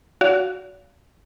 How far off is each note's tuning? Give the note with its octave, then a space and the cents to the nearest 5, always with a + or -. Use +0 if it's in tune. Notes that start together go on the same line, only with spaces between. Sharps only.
F#4 +0 D5 -45 F5 +0